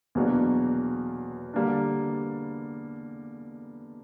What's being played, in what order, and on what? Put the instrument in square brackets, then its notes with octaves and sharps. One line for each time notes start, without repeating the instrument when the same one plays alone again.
[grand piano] E2 B2 F#3 A#3 D4
D3 G3 A#3 D4